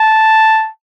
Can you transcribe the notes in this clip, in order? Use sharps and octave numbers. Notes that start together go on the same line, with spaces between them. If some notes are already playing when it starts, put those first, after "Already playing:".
Already playing: A5